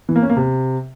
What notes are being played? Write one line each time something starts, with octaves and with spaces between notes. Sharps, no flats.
E3
A#3
C#4
A#3
C3